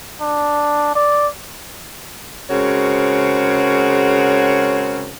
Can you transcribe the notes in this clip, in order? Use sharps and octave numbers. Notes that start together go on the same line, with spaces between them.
D4
D5
C#3 G#3 C4 F#4 A#4 C#5